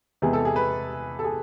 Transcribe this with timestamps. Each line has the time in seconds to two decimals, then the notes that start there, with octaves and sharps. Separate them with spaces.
0.22 E2 C3 G#3 B3 G#4
0.33 A4
0.45 G#4
0.56 B4
1.19 A4
1.24 G#4